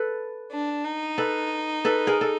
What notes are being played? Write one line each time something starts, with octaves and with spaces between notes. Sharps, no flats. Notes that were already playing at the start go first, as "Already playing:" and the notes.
Already playing: A4 B4
D4
D#4
A4 B4
A4 B4
G#4 A#4
A4